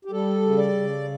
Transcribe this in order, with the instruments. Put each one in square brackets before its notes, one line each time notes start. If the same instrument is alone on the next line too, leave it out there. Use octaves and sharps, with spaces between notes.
[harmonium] G4
G3 A4
C#3
D5
C#3